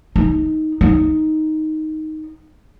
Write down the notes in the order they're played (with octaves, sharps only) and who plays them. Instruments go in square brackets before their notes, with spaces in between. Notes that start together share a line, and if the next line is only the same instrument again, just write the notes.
[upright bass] D#4
D#4